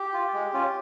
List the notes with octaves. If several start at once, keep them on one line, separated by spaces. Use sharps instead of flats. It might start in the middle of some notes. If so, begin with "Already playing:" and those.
Already playing: G4
F4
G#3
C#4 F4